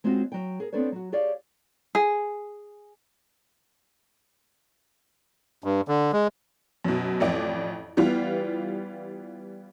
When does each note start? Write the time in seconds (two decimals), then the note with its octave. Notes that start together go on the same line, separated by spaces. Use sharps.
0.04 G#3 C4 C#4 F4 F#4
0.32 F#3 G5
0.60 G#4 A#4
0.73 B3 C4 D4 A4 B4 C#5
0.92 F#3 F#4
1.12 G4 G#4 C#5 D5 F5
1.95 G#4
5.64 G2
5.88 D3
6.13 G#3
6.84 F#2 B2
7.20 A1 F2 D5
7.97 E3 G3 B3 F4